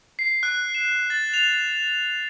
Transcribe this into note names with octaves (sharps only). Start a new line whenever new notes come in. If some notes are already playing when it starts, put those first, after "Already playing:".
C7
F#6
E7
A6
F7